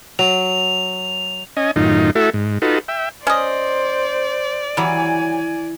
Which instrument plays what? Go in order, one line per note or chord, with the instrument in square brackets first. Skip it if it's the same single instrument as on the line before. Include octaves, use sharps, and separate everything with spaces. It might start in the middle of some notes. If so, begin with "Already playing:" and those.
[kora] F#3 [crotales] F7
[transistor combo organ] C#4 D#5 G#5
F#2 A2 D#3 D#4 F4
A3 E4 F#4 A4 E5
G#2
D#4 F4 F#4 A4 B4
E5 G5
[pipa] C#4 D#5 [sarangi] C5 [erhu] D5
[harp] E3 [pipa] F#3 G3 [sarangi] G#5